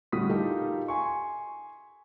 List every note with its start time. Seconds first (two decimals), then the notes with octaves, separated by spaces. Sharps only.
0.12 A2 D3 G3 F#4 D#6 B6
0.29 D#4 F4 G4 A4 A#4
0.88 G#5 C6 C#6